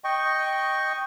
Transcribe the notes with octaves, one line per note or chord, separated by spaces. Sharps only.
D#5 G5 C#6